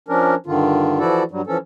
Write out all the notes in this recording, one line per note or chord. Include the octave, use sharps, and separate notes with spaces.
F3 C#4 D4 A#4
G2 D3 D#3 F4
E3 F3 E4 F#4 A4 D5
G2 F#3 G3
E3 F3 C#4 A4